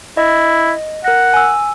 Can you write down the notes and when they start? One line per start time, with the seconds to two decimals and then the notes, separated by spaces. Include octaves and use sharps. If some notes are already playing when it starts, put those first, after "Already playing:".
0.17 E4 D#5
1.04 A#4 F#5 A#6
1.34 G#5 E6